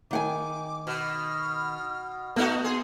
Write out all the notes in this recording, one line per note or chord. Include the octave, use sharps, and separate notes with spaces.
D#3 F#5 G#5 D6
B2 F6
A3 B3 D#4 F#4 F#5
G#4 C6